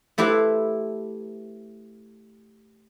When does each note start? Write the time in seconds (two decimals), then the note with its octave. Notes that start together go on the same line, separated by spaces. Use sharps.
0.18 A3 E4 G4 B4 C5